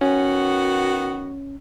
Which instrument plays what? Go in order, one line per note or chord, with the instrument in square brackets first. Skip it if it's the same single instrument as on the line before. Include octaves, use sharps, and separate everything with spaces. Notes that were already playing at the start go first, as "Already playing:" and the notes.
[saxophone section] D#3 B3 F#4 [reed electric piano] C#4